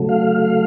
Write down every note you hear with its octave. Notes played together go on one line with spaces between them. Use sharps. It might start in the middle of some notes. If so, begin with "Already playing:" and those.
Already playing: C#3 F#3 A3
F5